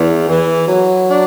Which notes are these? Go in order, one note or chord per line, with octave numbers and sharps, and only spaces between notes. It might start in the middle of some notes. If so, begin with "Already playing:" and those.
Already playing: E2
E3
F#3
D4